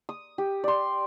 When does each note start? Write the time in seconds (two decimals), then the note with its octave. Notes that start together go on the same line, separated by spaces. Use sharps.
0.09 D#6
0.38 G4
0.64 D5 C6